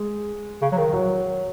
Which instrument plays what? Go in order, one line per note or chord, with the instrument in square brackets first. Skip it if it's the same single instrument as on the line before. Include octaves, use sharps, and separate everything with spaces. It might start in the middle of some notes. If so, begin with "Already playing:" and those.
Already playing: [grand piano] G#3
[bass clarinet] C#3
F#3
D#3
[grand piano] F#3